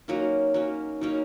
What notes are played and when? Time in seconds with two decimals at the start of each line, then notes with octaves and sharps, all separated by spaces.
0.08 F#3 A#3 C#4 D#4
0.54 F#3 A#3 C#4
1.01 F#3 A#3 C#4 D#4